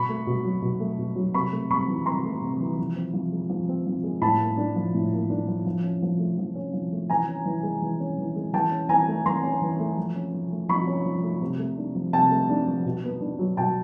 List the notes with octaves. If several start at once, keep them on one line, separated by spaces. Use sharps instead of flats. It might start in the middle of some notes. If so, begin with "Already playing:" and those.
Already playing: B2 B5 C#6
A3
B2
F#3
B2
A3
B2
F#3
C3 B5 C#6
A3
C3 B5 C#6
E3
C3 A#5 C6
A3
C3
E3
F3
C4
F3
G#3
F3
C4
F3
G#3
A2 A5 B5
A#3
D4
F3
A2
A#3
D4
F3
F3
C#4
F3
A3
F3
C#4
F3
A3
E3 G#5 A#5
C#4
E3
G#3
E3
C#4
E3
G#3
E3 G5 A5
C#4
E3 G#5 A#5
A3
E3 A#5 C6
C#4
E3
A3
F3
C#4
F3
A3
F3 B5 C#6
C#4
F3
A3
C3
A3
D4
F3
C3 G5 A5
A3
D4
F3
B2
B3
D4
F#3
B2 G5 A5